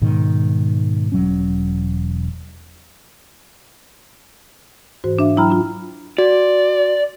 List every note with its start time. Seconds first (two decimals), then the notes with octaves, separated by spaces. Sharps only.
0.02 G#2 B2 D#3
1.12 E1 F#3 C#4
5.04 G#2 E3 F#4 C5
5.19 D4 E5 F5
5.37 F#3 E4 G5 A#5 B5 F6
5.50 D4 F4
6.18 F#4 D5